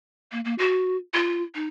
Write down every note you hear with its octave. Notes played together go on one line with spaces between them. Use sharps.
A#3
A#3
F#4
F4
D#4